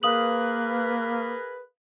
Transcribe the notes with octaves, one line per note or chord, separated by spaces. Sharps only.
A#3 G#4 A#4 B4 F5 D#6 F#7